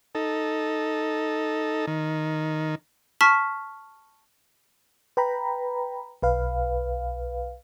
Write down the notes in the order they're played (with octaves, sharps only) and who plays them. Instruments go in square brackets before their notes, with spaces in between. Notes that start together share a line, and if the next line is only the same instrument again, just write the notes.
[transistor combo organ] D#4 A4
D#3
[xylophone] A5 C#6 F6 B6
[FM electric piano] B4 G5 A#5 B5
B1 B4 F5